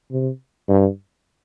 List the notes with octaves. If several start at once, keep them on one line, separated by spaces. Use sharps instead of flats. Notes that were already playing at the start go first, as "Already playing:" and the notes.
C3
G2